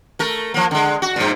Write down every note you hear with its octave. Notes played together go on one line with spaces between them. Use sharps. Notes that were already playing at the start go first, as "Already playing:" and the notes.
A3 A#4
F3 A#3
D3 G#3
F#4
G2 A#2